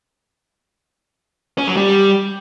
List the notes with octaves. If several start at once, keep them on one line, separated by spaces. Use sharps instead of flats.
C#4
F#3
G3